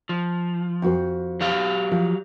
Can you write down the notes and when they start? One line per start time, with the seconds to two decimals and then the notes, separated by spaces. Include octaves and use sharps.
0.09 F3
0.82 F2 F#4 C5
1.41 F#3 G4 F5
1.91 F3